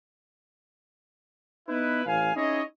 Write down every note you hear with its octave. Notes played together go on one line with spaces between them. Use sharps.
B3 D#4 E4 B4
A1 F5 G#5
C#4 D#4 E4 G#4 C#5 D#5